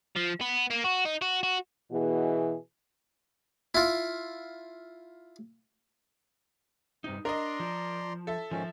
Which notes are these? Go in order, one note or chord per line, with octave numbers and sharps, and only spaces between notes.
F3
B3
A#3
F#4
D#4
F#4
F#4
B2 E3 G#4
E4 F4
G2 C3 D#4
D4 A#4 D5 D#5 A#5 C6
F3
A4 E5
G#2 D#3 F3 C#4